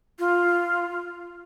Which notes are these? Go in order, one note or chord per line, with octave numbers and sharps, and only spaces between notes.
F4